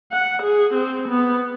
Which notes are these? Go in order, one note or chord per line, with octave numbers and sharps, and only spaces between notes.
F#5
G#4
C4
B3